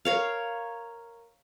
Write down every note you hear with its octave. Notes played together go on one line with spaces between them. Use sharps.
A#4 C#5 F5